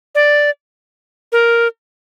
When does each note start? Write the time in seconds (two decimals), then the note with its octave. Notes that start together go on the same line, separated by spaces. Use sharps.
0.15 D5
1.32 A#4